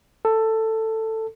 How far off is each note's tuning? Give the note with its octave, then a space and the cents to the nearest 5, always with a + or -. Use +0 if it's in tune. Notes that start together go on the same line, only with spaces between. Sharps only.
A4 +10